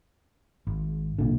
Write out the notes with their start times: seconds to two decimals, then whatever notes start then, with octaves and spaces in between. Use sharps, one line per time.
0.67 G#1
1.18 B1 A#2 D3